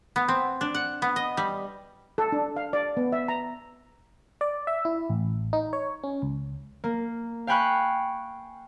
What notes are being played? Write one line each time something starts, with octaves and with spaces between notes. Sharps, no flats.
B3
C4
D4
F#5
B3
D#5
G3
A4
D4
F5
D5
B3
E5
A#5
D5
E5
E4
A1
D#4
C#5
C#4
C#2
A#3
F5 G5 G#5 B5 C#6 F#6